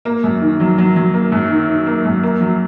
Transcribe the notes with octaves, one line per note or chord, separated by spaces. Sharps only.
A#3
F#2
D#3
F#3
F#3
F#3
A#3
F#2
D#3
D#3
A#3
F#2
A#3
F#3